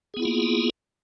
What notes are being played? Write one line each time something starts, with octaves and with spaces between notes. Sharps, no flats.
A#3 B3 E4 F4 G#4